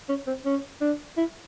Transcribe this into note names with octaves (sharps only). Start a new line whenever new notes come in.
C#4
C4
C#4
D4
E4